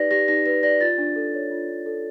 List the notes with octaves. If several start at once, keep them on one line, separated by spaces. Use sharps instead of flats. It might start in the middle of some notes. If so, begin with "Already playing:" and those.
Already playing: D#4 G4 B4 D5 A#6
G4 A#6
D#4 A#6
B4 A#6
D5 A#6
F4 A6
D4
A4
C#5
F4
D4
A4